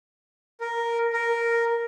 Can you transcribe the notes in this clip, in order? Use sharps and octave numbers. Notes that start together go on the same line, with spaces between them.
A#4
A#4